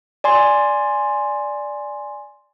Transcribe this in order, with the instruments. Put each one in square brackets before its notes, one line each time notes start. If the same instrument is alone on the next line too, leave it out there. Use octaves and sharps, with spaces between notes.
[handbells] D5 G#5 C6